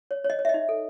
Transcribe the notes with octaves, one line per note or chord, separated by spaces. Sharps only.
C#5
C#5
D#5
C#5
E5
D#5
D#4
A4